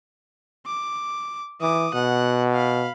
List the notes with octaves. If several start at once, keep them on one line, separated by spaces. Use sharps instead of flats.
D6
E3 D6 D#6
B2 F#5
F5 B5